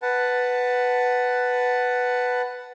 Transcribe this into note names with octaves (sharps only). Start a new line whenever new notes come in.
B4 F#5 A5